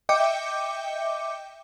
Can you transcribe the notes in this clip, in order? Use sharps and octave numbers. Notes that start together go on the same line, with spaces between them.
D#5 E5 G5 D6 G6 C#7